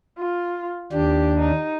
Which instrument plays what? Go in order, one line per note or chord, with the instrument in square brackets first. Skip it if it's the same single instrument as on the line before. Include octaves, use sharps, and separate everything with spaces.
[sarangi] F4
[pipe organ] D#2 D4 [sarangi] G4
[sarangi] D#4